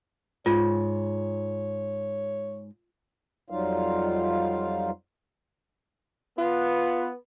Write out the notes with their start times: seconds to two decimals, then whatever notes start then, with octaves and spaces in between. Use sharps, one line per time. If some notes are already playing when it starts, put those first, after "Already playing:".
0.46 G#2 F4 C#5
3.50 F2 F#3 G3 D#4 F4 F5
6.38 B3 F4